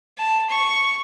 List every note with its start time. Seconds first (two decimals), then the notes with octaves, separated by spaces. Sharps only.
0.18 A5
0.50 C#6